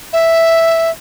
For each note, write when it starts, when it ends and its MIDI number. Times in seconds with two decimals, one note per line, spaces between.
0.13 0.91 76